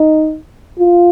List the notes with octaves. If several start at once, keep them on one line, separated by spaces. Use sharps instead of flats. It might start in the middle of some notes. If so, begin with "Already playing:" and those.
Already playing: D#4
F4